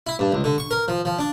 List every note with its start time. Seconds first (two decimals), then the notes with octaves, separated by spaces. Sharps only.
0.07 E4
0.19 G2
0.32 C#2
0.44 D3
0.58 C#6
0.71 A#4
0.88 F3
1.05 F3
1.19 D4